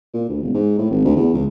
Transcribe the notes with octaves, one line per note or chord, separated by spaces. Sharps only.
A#2
D2
E1
G#2
A2
G#1
D2
E2
C#2